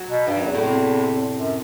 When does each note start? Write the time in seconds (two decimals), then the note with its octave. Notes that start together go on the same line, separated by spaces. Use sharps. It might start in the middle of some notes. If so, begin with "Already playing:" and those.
Already playing: F#3
0.09 B2
0.27 G2 G3
0.36 F#2 F#3
0.45 E2
0.55 A2
0.64 C3
1.37 F#2